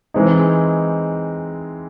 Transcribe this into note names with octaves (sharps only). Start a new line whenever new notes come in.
E3 G#3 C4 D#4